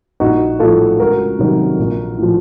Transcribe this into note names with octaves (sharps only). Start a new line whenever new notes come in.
A#1 D#4 F#4
A2 F3 F4 A4
C#2 F#4 A#4
C3 D#3 F#3
A#1
A2 F3